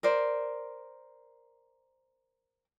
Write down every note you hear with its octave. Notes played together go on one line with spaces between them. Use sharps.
A#4 C5 D5